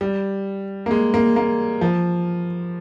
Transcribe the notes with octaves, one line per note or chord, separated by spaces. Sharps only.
G3
A#3
G#3
A#3
A#3
F3